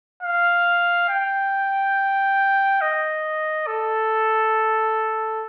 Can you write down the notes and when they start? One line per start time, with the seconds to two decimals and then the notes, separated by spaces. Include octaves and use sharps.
0.23 F5
1.10 G5
2.81 D#5
3.67 A4